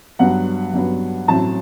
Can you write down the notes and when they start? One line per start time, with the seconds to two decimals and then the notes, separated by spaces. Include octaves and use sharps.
0.19 G2 F#3 B3 F#5
0.74 G2 F#3 B3
1.28 A1 A2 F#3 C4 A5